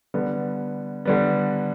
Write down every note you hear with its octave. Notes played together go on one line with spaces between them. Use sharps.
D3 G3 B3
D3 G3 B3